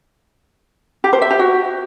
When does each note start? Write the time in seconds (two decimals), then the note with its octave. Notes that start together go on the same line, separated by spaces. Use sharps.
1.04 G4
1.13 C5
1.22 E5
1.31 G4
1.39 F#4